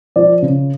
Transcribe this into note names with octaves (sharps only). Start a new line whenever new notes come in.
F3 D5
C#3